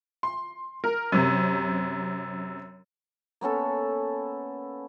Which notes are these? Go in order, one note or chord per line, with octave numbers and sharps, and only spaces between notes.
C6
A#4
F#2 C3
A#3 B3 C#4 A4